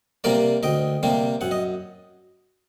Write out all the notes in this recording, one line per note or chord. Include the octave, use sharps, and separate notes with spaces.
C3 G3 A#3 A#4 D5
D2 D#5 G5
C3 G3 A#3
F#2 F#5
D#5